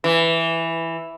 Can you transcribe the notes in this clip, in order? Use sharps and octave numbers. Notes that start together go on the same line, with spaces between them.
E3